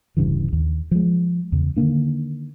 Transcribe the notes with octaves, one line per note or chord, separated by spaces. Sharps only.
D1 G2 C#3 E3
D#2
F3 G#3
E2 C#3
D3 D#3 A#3 D4